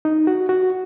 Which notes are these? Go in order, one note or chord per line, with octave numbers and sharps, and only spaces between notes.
D#4
F#4
F#4